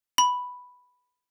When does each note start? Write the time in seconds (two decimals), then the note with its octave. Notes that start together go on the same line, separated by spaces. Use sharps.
0.18 B5